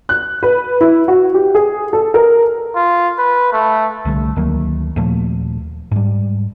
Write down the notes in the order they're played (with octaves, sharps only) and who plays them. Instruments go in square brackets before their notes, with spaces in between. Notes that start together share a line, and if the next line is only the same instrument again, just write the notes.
[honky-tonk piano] F#6
B4
E4
F#4
G4
G#4
A4
A#4
[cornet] F4
B4
A3
[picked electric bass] C2 D3 G3 A3
D2 D#3 F#3 A#3
D#2 A#2 F3 A3
G#2 G3